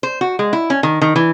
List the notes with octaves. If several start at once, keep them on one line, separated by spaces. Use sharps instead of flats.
C5
F#4
G#3
E4
C#4
D#3
D#3
E3